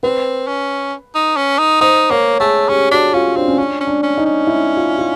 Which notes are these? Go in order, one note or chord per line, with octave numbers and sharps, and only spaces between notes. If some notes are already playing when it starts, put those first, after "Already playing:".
C4 B4
C#4
D#4
C#4
D#4
D#4 C5
A#3 C#5
A3 G#4
C#4 G4
D4 F#4
C#4 F4
C4 D4
C#4
C#4 D4
C#4
D4
C#4
D#4
C#4
E4
F4
F4